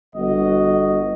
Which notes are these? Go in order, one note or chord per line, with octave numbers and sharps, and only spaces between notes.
G1 F#4 D#5